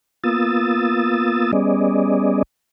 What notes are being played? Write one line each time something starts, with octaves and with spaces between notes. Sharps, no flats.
A#3 B3 F4 D#6 E6 A6
G3 B3 C#4 G#4 D5 D#5